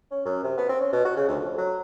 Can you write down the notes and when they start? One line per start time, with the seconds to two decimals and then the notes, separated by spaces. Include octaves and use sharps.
0.11 C#4
0.25 F#2
0.44 C3
0.57 B3
0.69 C4
0.81 C#4
0.92 B2
1.05 F#4
1.17 C#3
1.28 D2
1.40 F2
1.58 F#3